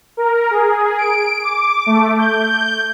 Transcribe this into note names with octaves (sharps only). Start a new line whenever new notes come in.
A#4
G#4
D7
D6
A3
G6